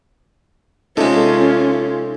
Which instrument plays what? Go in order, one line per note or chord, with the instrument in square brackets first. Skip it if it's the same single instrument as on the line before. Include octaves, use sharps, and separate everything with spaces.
[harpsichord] C3 G#3 [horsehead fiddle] C#4 F4 [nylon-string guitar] D#4 A4